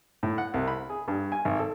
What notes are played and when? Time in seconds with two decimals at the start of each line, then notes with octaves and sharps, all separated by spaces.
0.23 A2
0.38 F#5
0.54 C2
0.68 B5
0.89 G#4
1.08 G2
1.32 G#5
1.45 G#1
1.60 A4